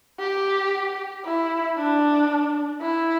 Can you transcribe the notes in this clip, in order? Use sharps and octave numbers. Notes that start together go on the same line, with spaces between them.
G4
E4
D4
E4